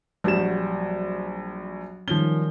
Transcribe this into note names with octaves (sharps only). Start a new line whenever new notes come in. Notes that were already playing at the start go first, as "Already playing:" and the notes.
A#1 F#3 G3 F#4 E7
D#3 F3 G3 C#4 G7